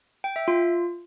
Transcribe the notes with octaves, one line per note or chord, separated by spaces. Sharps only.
G5
E5
F4